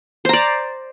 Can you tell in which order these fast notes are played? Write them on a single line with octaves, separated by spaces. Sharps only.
C5 A#5 D5